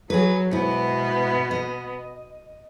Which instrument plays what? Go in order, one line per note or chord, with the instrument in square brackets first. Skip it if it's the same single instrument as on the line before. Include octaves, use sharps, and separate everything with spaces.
[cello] F#3 [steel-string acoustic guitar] G#4 B4
[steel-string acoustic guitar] G#2 E4 [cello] B2 B3
[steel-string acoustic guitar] D#5